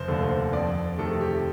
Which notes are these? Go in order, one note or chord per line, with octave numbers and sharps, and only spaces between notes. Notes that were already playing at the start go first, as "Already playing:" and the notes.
Already playing: F1 C5
D#2 D3 A3
C5
F2 D5
C3 D#3 A3 A4
G4